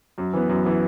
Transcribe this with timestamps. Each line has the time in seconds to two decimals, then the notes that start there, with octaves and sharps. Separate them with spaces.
0.18 F#2
0.33 E3 B3
0.49 F#2
0.65 E3 B3